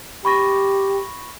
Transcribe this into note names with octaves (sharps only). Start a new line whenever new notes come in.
G4 B5 C#6 A#6